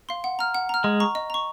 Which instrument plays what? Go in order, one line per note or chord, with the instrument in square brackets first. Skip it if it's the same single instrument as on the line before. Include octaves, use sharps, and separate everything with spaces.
[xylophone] F5 C6
F#5
A#5 F6
F#5
A#5 F6
[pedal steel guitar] G#3 [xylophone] D#5
[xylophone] A#5 C#6
D#5
A#5 C#6